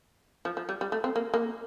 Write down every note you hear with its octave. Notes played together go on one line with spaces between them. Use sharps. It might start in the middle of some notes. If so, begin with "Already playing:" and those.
F3
F3
G3
G3
A3
C4
A#3
A#3